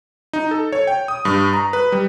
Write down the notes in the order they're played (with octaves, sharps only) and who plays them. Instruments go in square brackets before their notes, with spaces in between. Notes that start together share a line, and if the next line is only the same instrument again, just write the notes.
[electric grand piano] D#4
A4
C#5
G5
D#6
G2
A#5
B4
G3